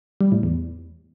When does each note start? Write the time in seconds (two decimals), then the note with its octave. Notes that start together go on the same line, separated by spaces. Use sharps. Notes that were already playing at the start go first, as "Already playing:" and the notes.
0.21 G3
0.32 A2
0.43 E2